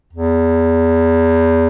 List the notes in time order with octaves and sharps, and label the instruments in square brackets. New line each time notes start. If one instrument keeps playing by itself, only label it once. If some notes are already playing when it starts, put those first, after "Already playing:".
[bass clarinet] E2